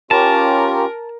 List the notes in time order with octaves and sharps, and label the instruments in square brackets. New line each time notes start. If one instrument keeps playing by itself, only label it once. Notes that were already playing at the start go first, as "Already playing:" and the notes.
[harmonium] C#4 F4 G4 [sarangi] A#4 [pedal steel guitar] A5